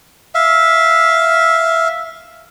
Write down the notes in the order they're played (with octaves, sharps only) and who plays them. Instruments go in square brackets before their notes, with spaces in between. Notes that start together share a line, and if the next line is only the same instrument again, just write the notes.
[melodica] E5 F5